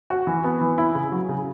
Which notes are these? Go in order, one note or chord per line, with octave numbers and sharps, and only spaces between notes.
F#4
E3
B3
E3
E4
C#3
F#3
C#3